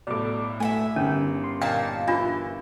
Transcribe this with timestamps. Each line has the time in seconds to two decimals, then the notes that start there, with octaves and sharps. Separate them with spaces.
0.07 B1 A2 D5 D6
0.60 A3 E5 F#5 G#5
0.96 G1 D3 D#3 C#4
1.44 C6
1.62 A#2 D#4 F5 G5 A5
2.08 E3 D4 F4